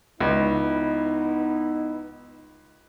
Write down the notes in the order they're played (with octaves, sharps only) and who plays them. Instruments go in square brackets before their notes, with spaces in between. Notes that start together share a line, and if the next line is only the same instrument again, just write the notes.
[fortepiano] C#2 [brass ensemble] B3 D#4 E4